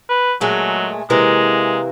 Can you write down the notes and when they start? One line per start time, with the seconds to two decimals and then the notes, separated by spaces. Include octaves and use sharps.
0.09 B4
0.41 A#2 F#3 G#3 A3
1.10 C3 E3 G#3 A#3